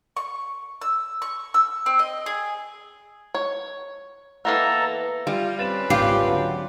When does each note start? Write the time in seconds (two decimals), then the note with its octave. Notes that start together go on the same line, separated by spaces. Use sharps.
0.17 C#6
0.82 E6
1.22 C#6
1.54 E6
1.86 C4
1.99 D#5
2.26 G#4
3.35 C#5
4.45 E3 A#3 B3 A4 A#5
5.27 G3 F4
5.59 C4 C#4 B4 A6 E7
5.90 G#1 C#2 F4 G4
6.27 D3 F#3